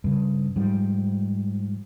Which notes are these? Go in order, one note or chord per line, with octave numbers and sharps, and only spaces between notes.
G2 C#3
G#2 F3 G3